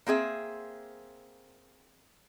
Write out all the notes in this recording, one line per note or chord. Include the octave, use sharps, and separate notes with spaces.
A#3 C4 G#4 E5